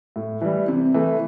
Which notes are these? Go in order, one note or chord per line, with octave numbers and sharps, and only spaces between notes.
A2
E3 G3
C3
E3 A3